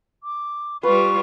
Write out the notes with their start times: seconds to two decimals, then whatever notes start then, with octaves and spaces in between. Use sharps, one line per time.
0.23 D6
0.83 G3 F4 B4 C#6